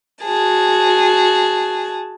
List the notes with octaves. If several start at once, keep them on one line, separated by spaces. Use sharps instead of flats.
F#4 G#4 A5